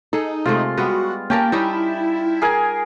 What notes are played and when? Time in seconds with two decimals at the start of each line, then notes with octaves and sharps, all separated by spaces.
0.13 D#4 G#4 A4
0.46 C3 G#3 A3 F4
0.77 G3 G#3 B3 F#4
1.30 A#3 C#4 G4 A#4 G5 A5
1.52 G3 C#4 D#4 E4
2.42 G#4 A#4 G#5